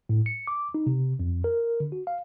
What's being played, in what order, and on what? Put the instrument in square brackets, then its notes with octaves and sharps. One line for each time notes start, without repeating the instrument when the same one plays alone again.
[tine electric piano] A2
C#7
D6
D#4
C3
F2
A#4
D3
F#4
F5